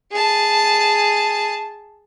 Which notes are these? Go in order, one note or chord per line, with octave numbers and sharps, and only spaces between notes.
G#4 A5